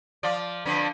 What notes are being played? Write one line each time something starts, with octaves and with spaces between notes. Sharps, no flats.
F3 F4 D5
F2 D3 B3